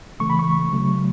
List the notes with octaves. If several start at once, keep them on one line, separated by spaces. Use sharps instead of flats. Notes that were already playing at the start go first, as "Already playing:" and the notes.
C#3 E3 A3 C#6
B5
C#6
C#3 F#3 A3